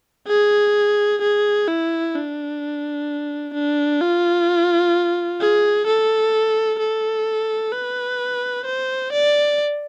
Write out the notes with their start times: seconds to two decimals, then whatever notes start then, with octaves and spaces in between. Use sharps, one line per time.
0.27 G#4
1.22 G#4
1.67 E4
2.15 D4
3.54 D4
4.01 F4
5.40 G#4
5.87 A4
6.79 A4
7.73 B4
8.65 C5
9.12 D5